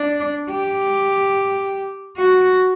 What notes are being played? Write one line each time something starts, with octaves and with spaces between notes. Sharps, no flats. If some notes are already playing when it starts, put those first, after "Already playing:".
Already playing: D4
G4
F#4